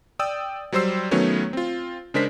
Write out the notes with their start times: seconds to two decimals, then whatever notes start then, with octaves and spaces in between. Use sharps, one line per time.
0.19 D5 G5 D#6 E6
0.72 F#3 G3 C5 C6 E6 C7
1.11 D#3 F#3 A3 B3 C#4 C#5
1.53 C4 F4
2.14 C#3 G#3 D4 A#4 C5 B6